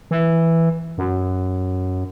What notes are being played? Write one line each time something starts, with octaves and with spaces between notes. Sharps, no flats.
E3
F#2